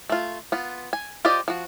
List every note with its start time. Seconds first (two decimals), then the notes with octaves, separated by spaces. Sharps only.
0.09 A3 F4
0.52 B3 F4
0.93 G#5
1.25 F4 G4 C5 D5 D#5
1.48 F3 F#4